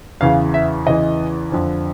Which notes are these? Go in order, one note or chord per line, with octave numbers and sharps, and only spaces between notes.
E2 C#3 E3 F5
E5
E2 C#3 E3 D#5
F2 D3 F3